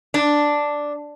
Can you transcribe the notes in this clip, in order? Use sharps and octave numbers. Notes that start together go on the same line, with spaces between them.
D4